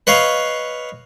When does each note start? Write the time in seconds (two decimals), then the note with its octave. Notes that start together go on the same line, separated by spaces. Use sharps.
0.07 B4 C#5 D#5 F5